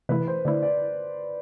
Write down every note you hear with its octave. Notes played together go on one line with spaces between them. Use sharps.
C3 E3 A3 E4 B4
C5
D3 A3 E4 D5
D5